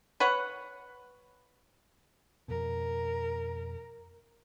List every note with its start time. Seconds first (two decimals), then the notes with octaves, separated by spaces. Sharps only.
0.20 B4 C#5 F#5
2.48 F2 B2 A#4